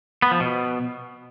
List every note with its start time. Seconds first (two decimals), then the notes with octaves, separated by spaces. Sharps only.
0.22 B3
0.31 F3
0.40 B2